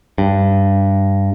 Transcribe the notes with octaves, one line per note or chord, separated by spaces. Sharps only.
G2